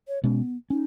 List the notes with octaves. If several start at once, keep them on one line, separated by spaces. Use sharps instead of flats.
C#5
B2 G#3 B3 C#4
C#4 D#4